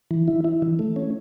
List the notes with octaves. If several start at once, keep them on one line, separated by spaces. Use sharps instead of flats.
E3
E4
E4
E3
A3
C#4